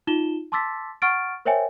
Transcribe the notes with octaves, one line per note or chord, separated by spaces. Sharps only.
D#4 F4 E7 G7
A5 C6 D6 E6 A6 B6
F#5 C#6 F6 A6 D7
A#4 C5 C#5 E5 G5 G#5